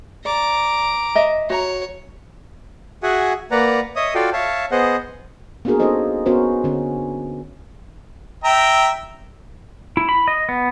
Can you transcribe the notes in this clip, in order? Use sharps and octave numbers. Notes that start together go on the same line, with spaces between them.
D5 A#5 D6
D#5 E5
F#4 C#5 A#5
F#4 G#4 E5 F#5 G#5
A#3 B4 D5 F#5 A#5
C#5 D#5 E5 D#6
F4 F#4 A4 D5 F5 G5
C#5 E5 F5 A5
B3 G#4 C5 D#5 F#5
A#3 B3 D4 F#4 G#4 A#4
A#3 C#4 D#4 A4 C5 D#5
B3 C#4 F#4 A#4 C5
D3 C#4
E5 G5 A#5
E4
B5
D#5
B3